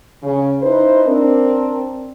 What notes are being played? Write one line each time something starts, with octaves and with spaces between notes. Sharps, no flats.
C#3
D#4 E4 B4 C5
C4 D4 A#4